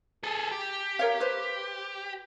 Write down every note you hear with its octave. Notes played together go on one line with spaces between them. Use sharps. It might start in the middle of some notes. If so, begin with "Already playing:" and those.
G#4 A4
G4
A#4 C#5 F5
B4 C5